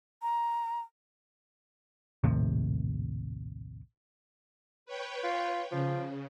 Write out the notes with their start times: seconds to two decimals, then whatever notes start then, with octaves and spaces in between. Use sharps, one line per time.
0.22 A#5
2.24 A#1 D#2 A2 C3
4.86 B4 C#5 G5
5.24 F4
5.71 C#3 F3